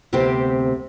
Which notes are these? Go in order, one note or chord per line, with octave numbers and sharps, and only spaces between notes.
D2 C3 B3 C4 G4 C5